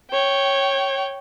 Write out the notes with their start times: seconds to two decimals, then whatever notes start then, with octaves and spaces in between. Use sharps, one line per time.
0.11 C#5 G5